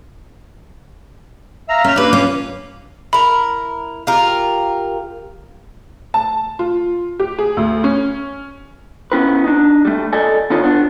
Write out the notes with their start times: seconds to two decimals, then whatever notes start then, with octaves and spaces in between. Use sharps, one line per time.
1.69 E5 F5 A#5
1.84 A3 C#4 E5 F6
1.96 A#3 D4 G4 B4
2.13 C#4 F4
3.13 E4 A#4 B5
4.07 F4 G4 A#4
6.14 A5
6.59 F4
7.20 G4
7.39 G#4
7.57 D2
7.84 C#4
9.12 B3 C#4 E4 B4
9.44 D4 D#4
9.85 G3 A3
10.13 A4 D5 D#5 G#5
10.50 D#2 D3 D#4 F4 C#5
10.64 B3 D4